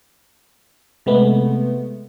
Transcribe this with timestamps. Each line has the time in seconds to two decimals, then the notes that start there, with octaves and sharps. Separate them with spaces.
1.06 C3 G#3 A3 B3